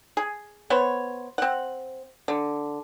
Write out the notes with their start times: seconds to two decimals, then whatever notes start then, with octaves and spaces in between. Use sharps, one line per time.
0.17 G#4
0.70 B3 C5 C#5
1.38 C4 F#5
2.28 D3